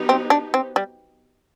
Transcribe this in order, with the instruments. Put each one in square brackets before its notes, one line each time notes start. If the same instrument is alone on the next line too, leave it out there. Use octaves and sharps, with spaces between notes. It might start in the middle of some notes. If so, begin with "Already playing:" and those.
Already playing: [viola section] F#3 B3 D#4 G4 B4
[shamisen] C4
D4
C4
G3